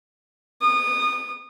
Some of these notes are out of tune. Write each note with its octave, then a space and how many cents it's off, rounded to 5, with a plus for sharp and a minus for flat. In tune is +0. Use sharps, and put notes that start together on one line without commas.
D#6 -25